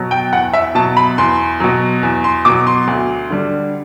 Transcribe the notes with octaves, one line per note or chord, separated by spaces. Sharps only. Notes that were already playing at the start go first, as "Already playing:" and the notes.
Already playing: B2 F#3
G5
E2 F#5
E5
B2 F#3 A5
B5
E2 C6
B2 F#3
E2
C6
B2 F#3 D6
C6
D2
D3 G3 D4